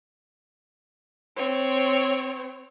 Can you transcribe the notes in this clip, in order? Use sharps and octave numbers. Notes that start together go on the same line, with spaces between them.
C4 C#5